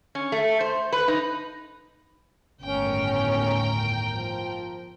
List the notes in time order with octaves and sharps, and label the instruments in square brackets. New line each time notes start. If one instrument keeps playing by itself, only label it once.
[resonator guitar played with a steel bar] C#4
A3
C5
B4
D#4
[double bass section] G1 D#2 A2 [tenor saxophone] C#4 [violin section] A#4 G5
[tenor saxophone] F3